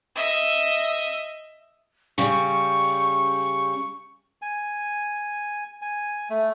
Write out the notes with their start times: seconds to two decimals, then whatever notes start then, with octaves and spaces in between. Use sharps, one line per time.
0.16 D#5 E5
2.18 C#3 G3 C#6
4.42 G#5
5.82 G#5
6.30 A3